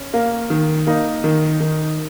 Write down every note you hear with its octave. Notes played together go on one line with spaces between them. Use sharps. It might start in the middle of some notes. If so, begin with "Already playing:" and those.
Already playing: C#4
A#3
D#3
A#3 D#4
D#3
D#3